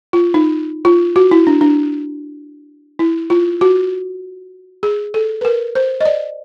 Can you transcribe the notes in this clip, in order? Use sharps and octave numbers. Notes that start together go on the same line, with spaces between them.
F4
D#4
F4
F#4
E4
D4
D4
E4
F4
F#4
G#4
A4
B4
A#4
C5
D#5
D5